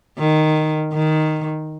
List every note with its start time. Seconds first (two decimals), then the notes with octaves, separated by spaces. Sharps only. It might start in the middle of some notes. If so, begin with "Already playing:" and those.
0.19 D#3
0.93 D#3